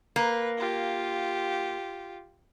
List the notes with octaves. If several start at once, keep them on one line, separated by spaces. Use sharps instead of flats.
A#3 B4
F4 G4